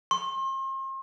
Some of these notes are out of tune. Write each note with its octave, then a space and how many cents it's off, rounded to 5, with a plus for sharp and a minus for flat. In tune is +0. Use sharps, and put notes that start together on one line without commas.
C6 +40